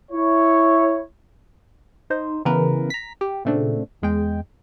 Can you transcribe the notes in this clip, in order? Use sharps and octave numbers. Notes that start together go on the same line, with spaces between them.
E4 C#5
D#4 C5
C#3 E3 B3 A#4 B4
A#5 B6
G4
A#2 C#3 A3 C4 D4
E2 G#3 G5